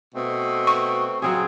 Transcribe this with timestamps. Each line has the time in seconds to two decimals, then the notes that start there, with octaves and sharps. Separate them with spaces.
0.14 B2 A3 C4
0.67 C#6
1.22 C#3 F#3 C4 G#4